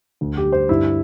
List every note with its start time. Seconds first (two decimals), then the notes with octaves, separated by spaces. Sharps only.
0.21 D2
0.37 G4
0.44 G3
0.52 C5
0.69 G2 E4